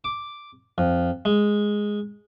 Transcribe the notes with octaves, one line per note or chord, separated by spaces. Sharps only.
D6
F2
G#3